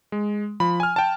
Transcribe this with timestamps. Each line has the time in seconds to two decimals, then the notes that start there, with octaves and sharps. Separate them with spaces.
0.12 G#3
0.60 F3 B5
0.80 G#5 F6
0.96 G5 A5